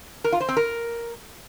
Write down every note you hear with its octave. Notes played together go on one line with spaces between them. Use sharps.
A#4
F4
C5
C4
A#4